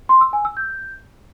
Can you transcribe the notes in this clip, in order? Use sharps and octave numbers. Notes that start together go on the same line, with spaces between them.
C6
E6
G#5
E6
G6